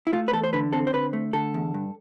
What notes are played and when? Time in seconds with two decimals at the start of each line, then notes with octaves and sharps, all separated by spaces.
0.07 E4
0.13 A3 F4
0.28 B4
0.33 E2 A4
0.44 C5
0.53 D3 B4
0.73 C4 A4
0.87 C5
0.93 D3 B4
1.13 A3
1.33 D3 A4
1.54 E2
1.74 G2